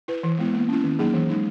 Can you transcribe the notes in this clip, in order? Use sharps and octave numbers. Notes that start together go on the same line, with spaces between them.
E4 B4
E3
G#3 B3 E4
A#3
C#4 E4
D#3
F#3 A#3 D#4 G#4
E3
G#3 D#4